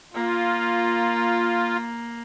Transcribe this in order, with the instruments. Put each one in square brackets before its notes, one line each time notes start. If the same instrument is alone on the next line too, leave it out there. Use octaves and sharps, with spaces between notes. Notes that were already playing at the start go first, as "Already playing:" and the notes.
[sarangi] A#3 [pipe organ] F4